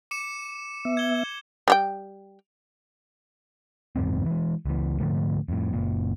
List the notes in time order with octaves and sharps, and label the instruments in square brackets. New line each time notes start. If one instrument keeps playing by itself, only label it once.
[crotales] D6 C#7 E7
[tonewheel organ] B3 E5
[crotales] G#6 G7
[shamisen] G3 G4 G5
[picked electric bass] F#1 E2 G#2 C4
E3 G#3
C#2 E3
G#2 D3 F3 A3
F2 A2
F#1 A#2